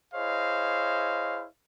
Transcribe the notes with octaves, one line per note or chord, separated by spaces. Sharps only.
E4 G#4 C5 C#5 D#5 F5